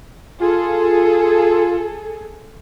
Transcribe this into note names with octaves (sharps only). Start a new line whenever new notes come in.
F4 G#4 A4